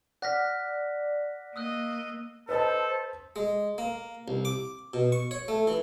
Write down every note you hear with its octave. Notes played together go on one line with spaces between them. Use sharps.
D5 F#5 F6 F#6 A#6 B6
A#3 D#5 D#6 E6 F#6
A4 B4 C5 D#5 A5
G#3
A#3
C2
D6
B2
C#6
C#5
A3
E3